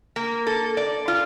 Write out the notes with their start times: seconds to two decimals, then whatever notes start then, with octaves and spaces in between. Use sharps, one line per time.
0.16 A#3
0.47 A4
0.77 D5
1.08 F4